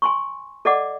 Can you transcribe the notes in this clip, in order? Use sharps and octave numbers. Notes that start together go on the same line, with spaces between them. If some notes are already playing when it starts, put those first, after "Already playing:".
G#5 C6 C#6
A4 D5 D#5 F#5 D6